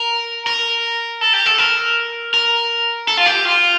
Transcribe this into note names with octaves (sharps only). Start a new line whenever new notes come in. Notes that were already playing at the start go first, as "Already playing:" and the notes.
Already playing: A#4
A#4
A4
G4
A4
A#4
A#4
A4
F4
G4
F4